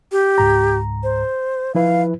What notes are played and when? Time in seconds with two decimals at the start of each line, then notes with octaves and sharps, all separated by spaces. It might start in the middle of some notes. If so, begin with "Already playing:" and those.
0.12 G4
0.38 C#2 G#2 A#5
1.03 C5
1.75 F3 E4 B4 F5